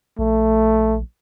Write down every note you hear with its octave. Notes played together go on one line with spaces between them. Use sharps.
A#1 A3